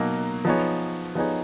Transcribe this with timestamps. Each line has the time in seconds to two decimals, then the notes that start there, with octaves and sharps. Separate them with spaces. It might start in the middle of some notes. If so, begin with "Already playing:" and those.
Already playing: B2 F#3 A#3 D#4
0.45 F3 B3 D#4 G#4 C#5
1.15 F3 B3 D#4 G#4 C#5